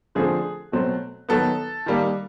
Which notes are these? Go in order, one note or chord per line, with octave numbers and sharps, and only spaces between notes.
D3 F3 A3 C4 G#4
B2 F#3 A3 C4
D#3 F#3 B3 A4
D#3 G3 A#3